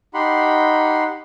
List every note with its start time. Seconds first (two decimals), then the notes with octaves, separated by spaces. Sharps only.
0.14 D#4 G4 F#5 B5 C6